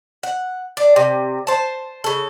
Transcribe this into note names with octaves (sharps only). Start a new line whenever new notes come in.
F#5
D4
C3
C5 A5
C#3 A4